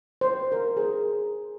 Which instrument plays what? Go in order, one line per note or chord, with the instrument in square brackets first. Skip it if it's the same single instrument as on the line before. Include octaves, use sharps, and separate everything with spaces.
[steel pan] C5
A#4
G#4
A#4